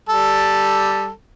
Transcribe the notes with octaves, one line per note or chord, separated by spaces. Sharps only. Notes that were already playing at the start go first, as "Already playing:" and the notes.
G3 A4